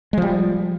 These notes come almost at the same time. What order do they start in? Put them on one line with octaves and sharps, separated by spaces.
G#3 F3 G3